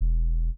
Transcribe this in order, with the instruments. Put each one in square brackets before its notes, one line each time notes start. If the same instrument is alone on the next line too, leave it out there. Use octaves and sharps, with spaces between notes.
[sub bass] E1